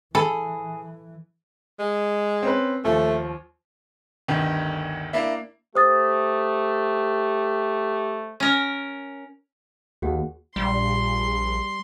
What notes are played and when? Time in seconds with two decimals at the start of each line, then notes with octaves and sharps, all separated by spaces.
0.15 E3 G#4 A4 B5
1.80 G#3
2.43 C4 C#4 B4
2.84 D#2 F3 A3
4.28 G1 D2 G2 D#3
5.13 A#3 D4 E4 E5
5.75 A3 G4 C5 D#6 A6
8.40 C#4 A#4
10.02 D#2 F#4 G#4 F#5
10.56 A#1 G3 C6